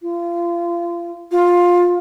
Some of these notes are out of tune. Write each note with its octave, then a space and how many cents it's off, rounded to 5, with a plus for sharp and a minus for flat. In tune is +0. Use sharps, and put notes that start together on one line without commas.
F4 -30
F4 +15